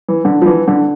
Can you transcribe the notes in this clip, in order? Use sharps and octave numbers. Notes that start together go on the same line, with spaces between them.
E3
D3
F3
E3
D3